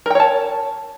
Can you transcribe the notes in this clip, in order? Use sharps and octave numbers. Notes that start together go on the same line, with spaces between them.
A#4 C#5 G5 A5